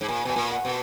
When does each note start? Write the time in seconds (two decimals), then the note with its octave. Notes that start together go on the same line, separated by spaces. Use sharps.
0.01 G#2
0.08 A#2 G#5
0.25 B2 G#5
0.36 A#2
0.51 F#5
0.65 B2